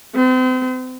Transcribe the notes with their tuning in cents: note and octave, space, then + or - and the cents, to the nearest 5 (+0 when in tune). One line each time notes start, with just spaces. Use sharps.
C4 -40